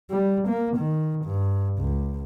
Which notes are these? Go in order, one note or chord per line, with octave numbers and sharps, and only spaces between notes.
G3
A#3
D#3
G2
C#2